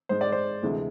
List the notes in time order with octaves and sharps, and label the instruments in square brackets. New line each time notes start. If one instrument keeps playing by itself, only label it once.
[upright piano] G#2 G#3 C5
D5
C5
D2 C3 E3 G#3